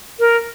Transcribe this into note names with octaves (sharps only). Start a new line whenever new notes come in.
A#4